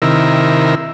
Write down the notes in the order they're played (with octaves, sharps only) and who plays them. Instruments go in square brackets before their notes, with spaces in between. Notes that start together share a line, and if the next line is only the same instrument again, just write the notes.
[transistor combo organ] C3 D#3 E4 A#4